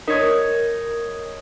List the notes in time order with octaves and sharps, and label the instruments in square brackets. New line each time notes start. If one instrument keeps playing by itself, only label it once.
[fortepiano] D#4 C#5 D#6 [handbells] A#4